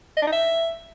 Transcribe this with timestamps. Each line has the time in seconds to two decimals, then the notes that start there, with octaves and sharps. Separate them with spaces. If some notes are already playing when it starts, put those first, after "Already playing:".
0.17 D#5
0.22 D4
0.27 D#4
0.32 E5